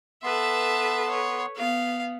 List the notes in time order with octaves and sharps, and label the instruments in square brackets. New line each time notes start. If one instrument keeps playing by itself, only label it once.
[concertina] B3 C6 [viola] A4 B4 [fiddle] E5 A5
[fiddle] C#5
[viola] B3 [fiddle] F5